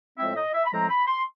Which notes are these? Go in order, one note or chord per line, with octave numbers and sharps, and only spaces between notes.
A2 F3 G#3 C4 E5
D#5
E5
B5
A2 F3 G#3 C4 A#5
B5
C6